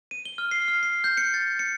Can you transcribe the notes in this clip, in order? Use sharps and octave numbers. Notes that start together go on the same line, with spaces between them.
D#7
G7
F6
C7
F6
C7
G6
C#7
A6
C#7